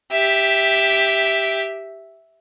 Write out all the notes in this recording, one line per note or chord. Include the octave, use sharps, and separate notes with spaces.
G4 E5